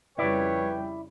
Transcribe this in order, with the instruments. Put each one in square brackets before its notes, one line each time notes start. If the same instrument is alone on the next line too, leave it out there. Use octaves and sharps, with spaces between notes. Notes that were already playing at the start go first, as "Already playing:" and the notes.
[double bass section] F2 C#3 G3 [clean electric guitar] E4 D5 [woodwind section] B4 C#5 [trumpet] G5